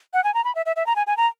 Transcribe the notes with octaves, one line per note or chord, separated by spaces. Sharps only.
F#5
G#5
A#5
B5
E5
E5
E5
A#5
G#5
G#5
A#5